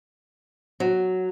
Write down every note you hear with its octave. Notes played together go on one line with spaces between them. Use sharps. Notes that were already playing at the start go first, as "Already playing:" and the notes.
F#3